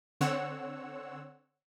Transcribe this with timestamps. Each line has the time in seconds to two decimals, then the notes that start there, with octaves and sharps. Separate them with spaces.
0.21 D3 C4 C#5 F#5 E6